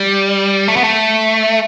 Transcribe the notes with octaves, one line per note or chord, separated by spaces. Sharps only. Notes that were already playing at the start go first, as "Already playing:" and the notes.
Already playing: G3
A3
B3
A3